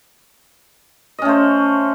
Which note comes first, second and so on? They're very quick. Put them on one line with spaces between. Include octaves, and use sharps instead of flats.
D#5 C#4 A3 C5